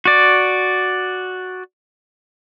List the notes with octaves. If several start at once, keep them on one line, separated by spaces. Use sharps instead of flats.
F#4 D5